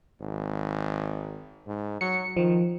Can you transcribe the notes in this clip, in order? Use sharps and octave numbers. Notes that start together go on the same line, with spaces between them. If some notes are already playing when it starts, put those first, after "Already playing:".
G#1
G#2
F#3 C#7
D#3 F3